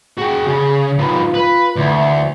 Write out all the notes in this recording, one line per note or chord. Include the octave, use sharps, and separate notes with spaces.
F#4 G#4 G5
C#3
D#3 B3 F4
B4
D2 E3